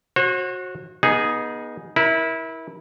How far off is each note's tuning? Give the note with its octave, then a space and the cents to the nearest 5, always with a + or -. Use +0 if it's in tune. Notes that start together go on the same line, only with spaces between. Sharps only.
F#4 -15 C5 +45
B3 -30 D#4 +0 G#4 +0
E4 -20 A#4 +25